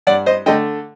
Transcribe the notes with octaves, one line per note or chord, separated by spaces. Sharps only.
G2 D5 F#5
C5 D#5
D3 A3 D#5 G5